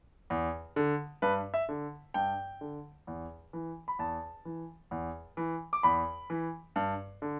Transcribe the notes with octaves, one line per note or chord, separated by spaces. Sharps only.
E2
D3
G2 B4
E5
D3
G2 G5
D3
E2
E3
B5
E2 A5
E3
E2
E3
D6
E2 B5
E3
G2
D3